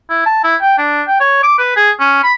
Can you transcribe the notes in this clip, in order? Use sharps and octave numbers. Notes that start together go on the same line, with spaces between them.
E4
A5
E4
G5
D4
G5
C#5
D6
B4
G#4
C#4
B5